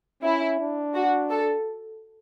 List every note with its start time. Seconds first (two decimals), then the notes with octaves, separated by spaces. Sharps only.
0.23 C#4 E4
0.59 D4
0.95 F#4
1.30 A4